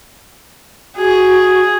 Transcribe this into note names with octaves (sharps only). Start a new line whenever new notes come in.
F#4 G#4